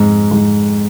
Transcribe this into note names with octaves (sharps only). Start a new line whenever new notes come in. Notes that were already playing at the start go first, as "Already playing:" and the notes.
Already playing: F2 G#2
G#2